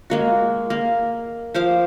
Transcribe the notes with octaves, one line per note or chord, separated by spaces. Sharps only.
G#3 A#3 F#4
A#3
F3 C5 F5 D6